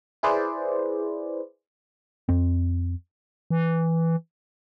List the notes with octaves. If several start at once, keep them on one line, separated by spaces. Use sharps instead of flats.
E4 G#4 B4 C5 D5
F2 C4
E3